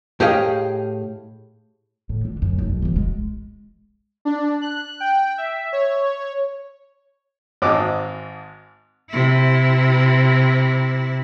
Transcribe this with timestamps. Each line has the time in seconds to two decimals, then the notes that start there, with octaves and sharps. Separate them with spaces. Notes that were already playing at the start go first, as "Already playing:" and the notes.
0.20 A2 G4 G#4 D#5 F5
2.09 A2
2.25 D3
2.42 F#2
2.58 E1 B1
2.82 B2 E3
2.96 G#3
4.25 D4
4.61 F#6
5.00 G5
5.38 E5
5.72 C#5
7.62 G#1 G#2 D#5 D6 E6
9.10 C3 E4